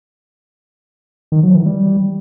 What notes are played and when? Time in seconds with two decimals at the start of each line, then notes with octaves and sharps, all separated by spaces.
1.32 D#3
1.43 F#3
1.55 E3
1.66 G3